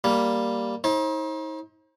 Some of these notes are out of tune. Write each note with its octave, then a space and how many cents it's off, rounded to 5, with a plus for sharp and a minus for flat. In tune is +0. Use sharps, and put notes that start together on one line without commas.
G3 +0 A#3 +0
D#4 +40 C5 +40